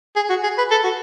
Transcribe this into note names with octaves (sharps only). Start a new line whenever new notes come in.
G#4
F#4
G#4
B4
A4
F#4